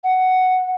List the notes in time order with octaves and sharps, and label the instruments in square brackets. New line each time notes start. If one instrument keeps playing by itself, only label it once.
[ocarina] F#5